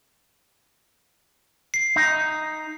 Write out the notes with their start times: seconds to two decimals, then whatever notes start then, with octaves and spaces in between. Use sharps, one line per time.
1.74 C7
1.96 D#4